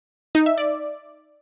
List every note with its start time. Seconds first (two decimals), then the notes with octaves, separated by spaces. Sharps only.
0.35 D#4
0.46 E5
0.58 D5